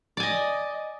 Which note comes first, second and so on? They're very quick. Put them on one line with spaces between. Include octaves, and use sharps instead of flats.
D5 G#5 D#5